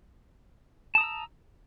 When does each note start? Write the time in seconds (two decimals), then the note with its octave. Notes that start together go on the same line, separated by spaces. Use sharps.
0.95 A5
0.98 D#6
1.01 A#5
1.04 E6